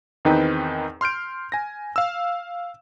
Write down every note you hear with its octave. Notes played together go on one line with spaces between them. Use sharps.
E2 D#3 C4 D#4 B4 G5
C6 F6 G6 D7
G#5 A#6
F5 E6